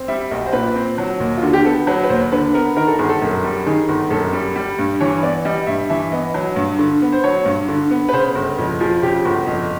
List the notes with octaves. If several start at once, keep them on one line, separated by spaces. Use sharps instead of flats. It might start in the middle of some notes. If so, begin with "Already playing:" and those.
Already playing: C4
G3 E5
B1 D#5
C5
A#2 B4
C4
F#3
D#2
F4
D3 F#4
G4
B3 A4
F#3 B4
B4
D#2 C5
D3 B4
B3 A#4
D#3 A#4
A4
G1 G#4
A4
F#2
G3
D#3 G#4
G1
F#2 A4
G3
G3
G2
E3 C#5
B3 D5
G3 D#5
G2 E5
E3 E5
B3 D#5
F#3
G2
D3
B3
C5
F#3 C#5
G2
D3
B3
B4
C#3 C5
G1
F2
F3 G#4
C#3 G4
G1
F2